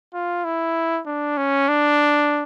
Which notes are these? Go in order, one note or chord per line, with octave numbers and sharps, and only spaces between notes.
F4
E4
D4
C#4
D4